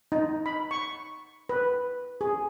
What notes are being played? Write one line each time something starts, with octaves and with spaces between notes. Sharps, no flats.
D#4
B5
C#6
B4
G#4